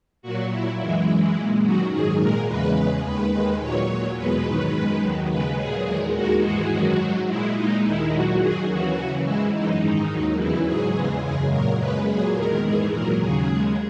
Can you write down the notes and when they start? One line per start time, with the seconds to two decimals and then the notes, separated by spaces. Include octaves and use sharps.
0.22 A#2 F#3 F#4
0.50 A#2 F#3 E4
0.79 F#2 E3 G#3 E4
1.07 F#2 E3 G#3
1.35 A#2 G#3
1.63 F#2 D#3 F#3 F#4
1.91 G#2 D#3 F#3 G#4
2.19 A#2 G#3 A#4
2.48 E2 C#3 E3 G#3 B4
2.76 E2 C#3 G#3
3.04 D#2 D#3 G#3 B4
3.33 D#2 D#3 G#3
3.60 A#2 F#3 C#5
3.89 A#2 F#3
4.17 E2 B2 G#3 B4
4.45 G#2 D#3 F#3
4.73 F#2 D#3 G#3
5.02 D#2 D#3 F#3
5.30 D#2 C#3 G#3 B4
5.58 A#2 F#3 G#4
5.86 E2 D#3 G#3
6.14 D#2 D#3 G#3 F#4
6.43 G#2 E3 G#3 F#4
6.71 F#2 D#3 F#3 F#4
6.99 G#2 F#3
7.28 A#2 G#3 E4
7.56 A#2 G#3 D#4
7.84 D#2 D#3 G#3 E4
8.12 A#2 F#3 F#4
8.40 F#2 D#3 F#3 G#4
8.69 D#2 C#3 E3 F#4
8.97 F#2 C#3 E3
9.25 G#2 E3 G#3 E4
9.54 F#2 E3 G#3 D#4
9.81 G#2 D#3 G#3
10.10 D#2 D#3 F#3
10.38 E2 C#3 E3 E4
10.66 G#2 F#3 G#4
10.94 E2 C#3 E3 G#3
11.22 F#2 C#3 G#3 G#4
11.51 A#2 F#3 A#4
11.79 F#2 C#3 G#3 B4
12.08 A#2 F#3 G#4
12.36 E2 D#3 G#3 A#4
12.63 G#2 E3 G#3 G#4
12.92 A#2 F#3 A#4
13.20 D#2 C#3 F#3 G#4
13.48 D#2 C#3 G#3